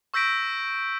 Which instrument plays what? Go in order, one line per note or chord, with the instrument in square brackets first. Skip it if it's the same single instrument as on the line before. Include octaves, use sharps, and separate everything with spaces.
[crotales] C#6 E6 G6 A#6 B6 D7